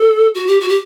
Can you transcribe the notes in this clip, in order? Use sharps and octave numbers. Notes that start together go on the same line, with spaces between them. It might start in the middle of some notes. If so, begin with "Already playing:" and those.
Already playing: A4
F#4
G4
F#4
G4